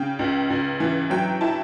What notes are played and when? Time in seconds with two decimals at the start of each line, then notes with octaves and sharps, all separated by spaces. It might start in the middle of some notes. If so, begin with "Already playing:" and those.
Already playing: C#3 G5
0.19 C#2
0.50 C#2
0.80 E3
1.10 F#3 G5
1.41 E4 A5